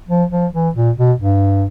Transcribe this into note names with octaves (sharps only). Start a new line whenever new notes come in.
F3
F3
E3
A#2
B2
G2